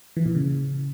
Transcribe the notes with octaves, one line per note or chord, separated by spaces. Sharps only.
E3
A#2
C#3